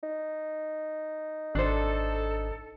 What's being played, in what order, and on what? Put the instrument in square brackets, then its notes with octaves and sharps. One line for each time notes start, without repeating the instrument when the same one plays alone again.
[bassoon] D#4
[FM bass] G#1 [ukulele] D4 C5 [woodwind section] A4